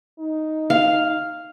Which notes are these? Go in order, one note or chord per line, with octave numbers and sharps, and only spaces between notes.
D#4
F5